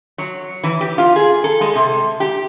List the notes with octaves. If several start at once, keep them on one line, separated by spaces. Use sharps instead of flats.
F#3
E3
G4
F4
G#4
A4
G#3
C3
G4